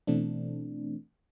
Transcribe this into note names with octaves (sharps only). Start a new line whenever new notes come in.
B2 E3 A3 C4 D4